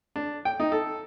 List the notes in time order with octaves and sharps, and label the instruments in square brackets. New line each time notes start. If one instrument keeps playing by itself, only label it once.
[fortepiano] D4
G5
D#4
A4